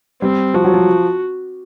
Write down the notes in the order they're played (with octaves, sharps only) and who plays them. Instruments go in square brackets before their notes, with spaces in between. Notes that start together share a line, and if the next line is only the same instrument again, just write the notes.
[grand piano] G3 [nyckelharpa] C4
[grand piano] F3 [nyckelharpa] F#4
[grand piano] F#3
F3